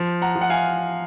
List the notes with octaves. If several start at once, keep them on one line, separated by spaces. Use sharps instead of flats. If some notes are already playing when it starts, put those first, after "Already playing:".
Already playing: F3
F#5 A#5
F3
F#5
F5 G#5